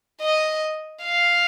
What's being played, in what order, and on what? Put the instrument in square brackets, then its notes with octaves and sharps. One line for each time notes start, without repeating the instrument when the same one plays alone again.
[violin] D#5
F5